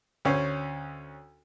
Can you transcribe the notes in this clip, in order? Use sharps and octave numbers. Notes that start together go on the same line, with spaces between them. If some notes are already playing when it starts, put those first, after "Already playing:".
D2 C#4 C5